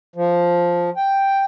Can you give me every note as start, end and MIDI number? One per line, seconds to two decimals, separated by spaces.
0.16 0.90 53
0.97 1.45 79